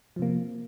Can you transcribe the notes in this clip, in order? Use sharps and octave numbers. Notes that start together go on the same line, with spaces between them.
C3 F3 A#3